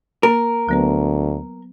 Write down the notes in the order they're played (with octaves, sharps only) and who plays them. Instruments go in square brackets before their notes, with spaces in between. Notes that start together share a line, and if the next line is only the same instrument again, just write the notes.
[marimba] A#3 [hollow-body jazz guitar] A#4
[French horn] D2 [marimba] F#3 B3 B4